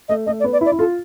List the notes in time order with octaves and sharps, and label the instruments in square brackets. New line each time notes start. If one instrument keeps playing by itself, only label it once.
[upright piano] A3 [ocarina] D#5
[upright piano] A3 [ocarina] D#5
[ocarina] D5
[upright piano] B3
[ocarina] D5
[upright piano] E4
[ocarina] D5
[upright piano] E4
[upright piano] F4 [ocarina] A4